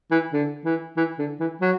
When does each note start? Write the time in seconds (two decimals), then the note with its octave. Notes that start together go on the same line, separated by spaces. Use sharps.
0.11 E3
0.33 D3
0.65 E3
0.97 E3
1.19 D3
1.40 E3
1.62 F#3